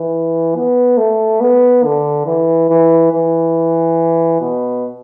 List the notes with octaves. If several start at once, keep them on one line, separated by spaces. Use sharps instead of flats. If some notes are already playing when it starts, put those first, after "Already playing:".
Already playing: E3
B3
A3
B3
D3
E3
E3
E3
B2